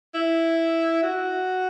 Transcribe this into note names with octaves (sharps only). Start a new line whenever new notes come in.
E4
F#4